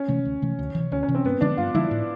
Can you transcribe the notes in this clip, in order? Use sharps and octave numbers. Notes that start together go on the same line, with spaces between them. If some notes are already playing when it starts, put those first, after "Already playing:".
Already playing: C#4
C3 E3 A3
D2
C3 E3 A3
D2
C3 E3
D2 C#4
C#4
C3 E3
C4
G2 B3
D3 F3 G#3 D4
G2 F4
D3 F3 G#3 E4
A2